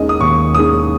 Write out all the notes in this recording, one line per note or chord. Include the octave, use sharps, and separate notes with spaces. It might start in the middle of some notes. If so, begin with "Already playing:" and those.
Already playing: D#2 D#3 G#3 C#4 D#5
D#6
D#2 C#6
D#3 G#3 C#4 D#6